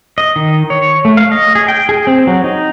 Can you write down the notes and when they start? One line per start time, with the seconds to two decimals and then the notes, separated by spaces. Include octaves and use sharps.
0.18 D#5
0.36 D#3
0.70 C#5
1.05 A3
1.17 F5
1.32 D#5
1.55 G#4
1.68 G5
1.89 G#4
2.07 C4
2.27 F#3
2.44 D#4